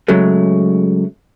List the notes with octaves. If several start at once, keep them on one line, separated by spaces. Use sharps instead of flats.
C#3 F#3 G#3 A3